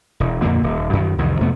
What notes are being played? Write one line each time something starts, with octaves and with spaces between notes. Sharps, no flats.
E1
F2 A#2 D3 A#3
D#1
F#2 D#3
C2 F2 D#3 E3
F2 C3 A3 B3